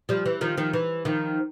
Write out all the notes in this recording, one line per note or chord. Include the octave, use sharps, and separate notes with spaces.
F3 G3
E3
D#3 F3
D#3 F3
E3
D#3 F3